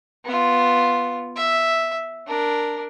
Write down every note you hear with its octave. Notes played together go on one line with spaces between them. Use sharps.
B3 F4
E5
D4 A#4